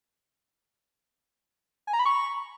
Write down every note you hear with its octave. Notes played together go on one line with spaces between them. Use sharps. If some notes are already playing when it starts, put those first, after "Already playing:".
G#5
A#5
B5
C#6